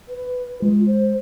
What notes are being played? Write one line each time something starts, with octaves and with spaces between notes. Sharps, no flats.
B4
G#3 F4
C5